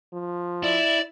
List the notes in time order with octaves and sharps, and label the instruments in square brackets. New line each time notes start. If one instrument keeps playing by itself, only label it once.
[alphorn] F3
[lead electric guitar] E4 [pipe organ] D5